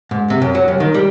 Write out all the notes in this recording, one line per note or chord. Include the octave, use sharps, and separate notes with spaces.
G#2
C3
F#2
F#3
C2
D#3
G3